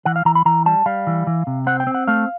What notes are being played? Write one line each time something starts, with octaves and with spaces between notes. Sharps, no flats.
E3 F#5
F5
E3 A#5
B5
E3 A#5
G3 A5
G3 F5
E3
E3
C3
C4 F#5
G5
C4
F#5
A3 F5